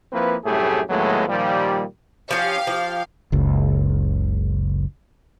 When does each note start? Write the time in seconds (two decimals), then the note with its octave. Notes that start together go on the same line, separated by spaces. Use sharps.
0.12 F3 A#3 C4 E4 B4
0.44 C2 F#2 A2 A3 G4 G#4
0.89 D#2 A2 F#3 G#3 A3 B3
1.28 A#2 D#3 F3 G3
2.31 F3 C#4 G4 F5
2.67 F3
3.32 F#1 C#2